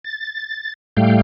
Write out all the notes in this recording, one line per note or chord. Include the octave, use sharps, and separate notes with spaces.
A6
A2 G3 A3 F5 G5